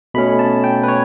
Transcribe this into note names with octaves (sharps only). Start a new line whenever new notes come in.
B2 A3 C#4 B5
A5
G5
B4
C#5